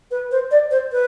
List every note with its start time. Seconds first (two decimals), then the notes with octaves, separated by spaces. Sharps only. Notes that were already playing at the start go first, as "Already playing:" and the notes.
0.11 B4
0.31 C5
0.51 D5
0.71 C5
0.92 B4